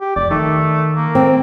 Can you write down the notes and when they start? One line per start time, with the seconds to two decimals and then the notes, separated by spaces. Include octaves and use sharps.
0.01 G4
0.16 F1 D5
0.31 D#3 A3
0.95 A#3
1.15 C4